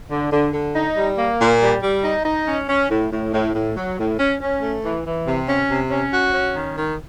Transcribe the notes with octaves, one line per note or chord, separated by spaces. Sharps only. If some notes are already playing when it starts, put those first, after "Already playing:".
D3
D3
D3
D#4
G3
A#3
A#2
G3
G3
D#4
D#4
C#4
C#4
A2
A2
A2
A2
F#3
A2
C#4
C#4
A3
E3
E3
C3
C#4
C3
C#4
F#4
C#4
D#3
D#3